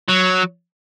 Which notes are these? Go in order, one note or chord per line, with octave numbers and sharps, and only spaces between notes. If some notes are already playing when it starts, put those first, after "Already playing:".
F#3